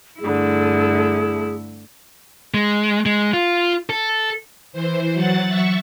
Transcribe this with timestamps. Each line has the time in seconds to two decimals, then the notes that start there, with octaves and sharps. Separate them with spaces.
0.20 G2 D3 A3 E4 G#4
2.54 G#3
3.06 G#3
3.33 F4
3.90 A4
4.72 E3 C5
5.14 F#3 F#5 A6
5.48 E5 C#6